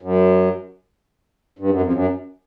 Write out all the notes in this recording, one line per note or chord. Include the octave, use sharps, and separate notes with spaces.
F#2
G2
F#2
F2
F#2